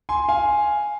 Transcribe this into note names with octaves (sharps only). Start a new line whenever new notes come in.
G#5 C6
F5 G#5